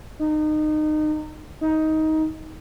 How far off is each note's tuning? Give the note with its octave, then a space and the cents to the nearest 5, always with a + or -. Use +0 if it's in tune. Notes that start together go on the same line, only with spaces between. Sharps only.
D#4 -25
D#4 +15